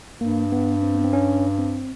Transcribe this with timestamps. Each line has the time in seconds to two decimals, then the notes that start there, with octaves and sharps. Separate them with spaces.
0.21 G2 A#3
0.52 B3
0.82 C4
0.95 B3
1.04 C4
1.13 C#4
1.59 C4